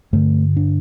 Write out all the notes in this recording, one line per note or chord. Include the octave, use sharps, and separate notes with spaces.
G2 D3 A3
D4